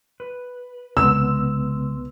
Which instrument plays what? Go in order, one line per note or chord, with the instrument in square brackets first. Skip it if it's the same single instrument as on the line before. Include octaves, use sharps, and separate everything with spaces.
[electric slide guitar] B4
[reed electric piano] C2 B3 [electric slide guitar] C#3 G#3 [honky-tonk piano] E6